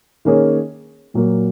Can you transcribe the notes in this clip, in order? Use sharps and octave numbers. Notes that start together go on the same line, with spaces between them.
D#3 A#3 C#4 G#4 C#5
A#2 F#3 A#3